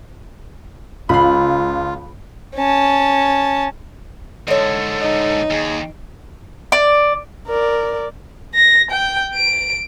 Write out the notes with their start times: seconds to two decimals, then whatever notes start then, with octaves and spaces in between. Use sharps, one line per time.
1.09 C#2 F4 B5 C6
2.56 C#4 A5
4.48 G#2 D3 A4 C#5 D#5
5.01 D#4
5.50 D#2 G#4
6.72 D5
7.47 A#4 D5
8.55 A#6
8.91 G5
9.35 D7